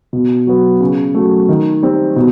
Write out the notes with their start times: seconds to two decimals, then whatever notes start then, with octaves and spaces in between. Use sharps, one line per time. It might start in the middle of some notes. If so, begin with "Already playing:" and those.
0.13 B2
0.47 F#3 B3
0.81 C#3
1.15 F#3 A3
1.49 D#3
1.83 G3 C4
2.16 B2